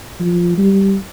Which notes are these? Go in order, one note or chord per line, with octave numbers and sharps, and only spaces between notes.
F3
G3